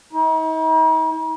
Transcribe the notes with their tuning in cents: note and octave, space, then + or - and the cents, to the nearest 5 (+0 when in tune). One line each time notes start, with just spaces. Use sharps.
D#4 +45